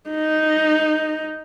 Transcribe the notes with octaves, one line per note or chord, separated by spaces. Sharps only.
D#4